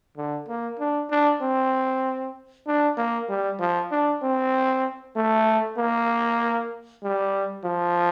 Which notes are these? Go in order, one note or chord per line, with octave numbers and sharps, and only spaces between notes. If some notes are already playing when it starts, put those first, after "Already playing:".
D3
A#3
D4
D4
C4
D4
A#3
G3
F3
D4
C4
A3
A#3
G3
F3